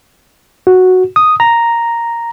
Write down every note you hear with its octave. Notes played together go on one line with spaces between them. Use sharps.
F#4
D#6
A#5